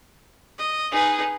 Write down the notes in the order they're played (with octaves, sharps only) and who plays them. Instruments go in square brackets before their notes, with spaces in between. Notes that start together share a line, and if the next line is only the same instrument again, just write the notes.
[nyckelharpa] D#5
[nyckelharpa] D#4 B4 [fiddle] G#4